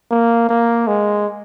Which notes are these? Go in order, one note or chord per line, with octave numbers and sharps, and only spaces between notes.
A#3
A#3
G#3